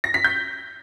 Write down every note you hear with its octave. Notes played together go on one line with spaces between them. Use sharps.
A#6
B6
G6